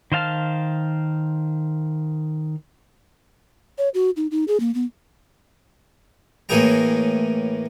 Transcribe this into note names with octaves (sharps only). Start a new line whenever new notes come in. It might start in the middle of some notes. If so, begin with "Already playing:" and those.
D#3 C5 F5 A5 F6
C#5
F#4
D#4
D#4
G#4
A#3
B3
A2 E3 A#3 G#4 G5 A#5